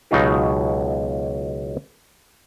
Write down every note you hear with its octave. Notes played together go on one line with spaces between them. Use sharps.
C#2 B2 F#3 D#4 F4 G4